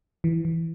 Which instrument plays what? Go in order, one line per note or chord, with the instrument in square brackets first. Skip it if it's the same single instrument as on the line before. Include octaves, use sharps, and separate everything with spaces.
[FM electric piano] E3
E3